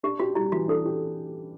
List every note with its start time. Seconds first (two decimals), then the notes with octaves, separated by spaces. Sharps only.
0.03 D4 G4
0.19 F#4 G4
0.35 G3 E4
0.52 E3 F#4
0.68 D4 A4
0.85 G4